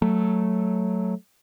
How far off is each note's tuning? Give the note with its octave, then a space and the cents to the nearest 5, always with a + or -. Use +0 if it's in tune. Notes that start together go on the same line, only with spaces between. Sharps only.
F#3 +0 A3 +0